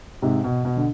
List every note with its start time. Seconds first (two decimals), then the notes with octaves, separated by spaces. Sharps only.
0.22 G#2 C3
0.44 B2
0.65 B2
0.77 D3